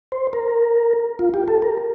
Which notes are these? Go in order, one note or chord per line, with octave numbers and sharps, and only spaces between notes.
C5
A#4
F4
G4
A4
A#4